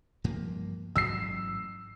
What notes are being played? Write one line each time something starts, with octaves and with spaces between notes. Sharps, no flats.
G2 F3 A#3
A1 G#2 F#3 E6 C7